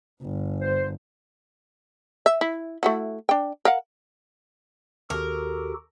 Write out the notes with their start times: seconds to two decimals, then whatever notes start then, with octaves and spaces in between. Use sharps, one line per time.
0.23 G1
0.61 C5
2.26 E5
2.41 E4
2.83 A3 E4 F#4
3.29 D4 G5
3.65 A#4 F5 F#5
5.10 D#2 F#4 G4 A4 A#4